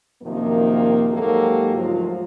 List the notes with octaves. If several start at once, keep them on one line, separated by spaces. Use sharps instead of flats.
F#2 C3 D#3 F3 A#3
G#2 F#3 A#3 F#4 G4 A4
D2 G#2 F3 F#3 F4